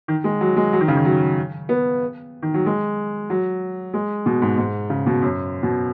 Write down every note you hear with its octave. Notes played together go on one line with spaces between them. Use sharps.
D#3
G#3
F#3
G#3
F#3
D#3
C#3
D#3
F#3
B3
D#3
F#3
G#3
F#3
G#3
B2
G#2
G#2
C#3
B2
F#2
B2